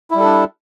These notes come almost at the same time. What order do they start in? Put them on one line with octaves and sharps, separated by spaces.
E4 G3 A4 D4